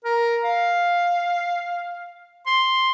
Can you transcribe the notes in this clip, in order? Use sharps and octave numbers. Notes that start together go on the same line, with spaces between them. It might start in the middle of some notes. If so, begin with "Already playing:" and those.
A#4
F5
C6